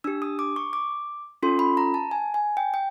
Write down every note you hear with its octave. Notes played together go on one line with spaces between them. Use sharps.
D4 G4 E6
D#6
D6
C#6
D6
C#4 F4 A4 C6
B5
A#5
A5
G#5
G#5
G5
G5